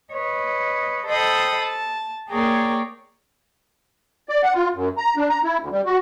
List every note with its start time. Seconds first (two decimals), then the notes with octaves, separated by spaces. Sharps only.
0.11 B4 C#5 D#5
1.06 A4 C5 D#5 G5 B5 D#6
1.59 A5
2.29 A#3 G#4 A#4 C#5 D5 G5
4.29 D5
4.43 F#5
4.54 F4
4.74 F#2
4.98 A#5
5.17 D4
5.29 A#5
5.43 E4
5.60 D2
5.72 G3
5.86 F#4